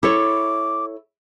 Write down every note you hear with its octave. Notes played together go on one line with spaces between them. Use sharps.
E4 A4 C#5 D6